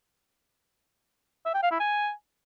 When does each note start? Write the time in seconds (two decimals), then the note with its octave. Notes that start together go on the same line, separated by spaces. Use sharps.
1.46 E5
1.54 G5
1.63 F5
1.71 E4
1.80 G#5